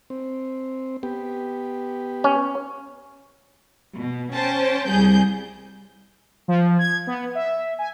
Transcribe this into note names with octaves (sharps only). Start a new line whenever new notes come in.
C4
B3 G4
C#4
B2
C#4 C5 G5 A5
C2 G3 G#4 G6
F3
G#6
B3
E5
G#5